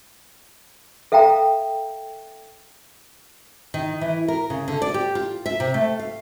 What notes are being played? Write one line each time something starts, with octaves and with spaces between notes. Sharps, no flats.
A4 E5 F5 G5 A#5
D#3
E3
A#4
C#3
D3
D5
G4
F4
E5
C3
A3
F5